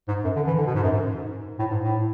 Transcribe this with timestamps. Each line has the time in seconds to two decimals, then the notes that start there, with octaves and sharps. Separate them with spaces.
0.08 G#2
0.24 F#2
0.36 D3
0.47 E3
0.59 D3
0.67 B2
0.75 G#2
0.84 F#2
0.92 G#2
1.59 A2
1.71 G#2
1.82 A2